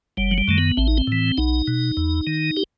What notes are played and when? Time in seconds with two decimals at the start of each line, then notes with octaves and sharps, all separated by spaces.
0.17 F#1 G3
0.31 F#3
0.38 G3
0.48 F#2 D#3 A3
0.58 B3
0.77 A1 C4
0.88 D#4
0.97 C4
1.07 A2 E3
1.38 B1 D#4
1.68 B2
1.97 E2
2.27 D#3
2.57 G4